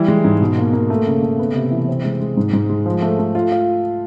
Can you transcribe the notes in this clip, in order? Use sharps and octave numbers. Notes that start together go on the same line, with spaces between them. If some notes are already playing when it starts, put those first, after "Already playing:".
Already playing: E3 G3
G#3
G#2
B2
A#3
A#3
A3
C#3
A3
B3
C3
E3
C4
G#3
G#3
G#2
G#2
G#3
F3
A3
A3
F4
F4